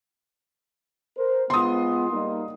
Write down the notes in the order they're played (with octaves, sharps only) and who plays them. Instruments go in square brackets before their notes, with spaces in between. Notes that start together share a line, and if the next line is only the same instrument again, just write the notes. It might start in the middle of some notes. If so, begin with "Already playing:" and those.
[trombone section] A#4 C5
[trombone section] G#3 B3 F4 [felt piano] C6 D#6
[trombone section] G3 A#3 D#4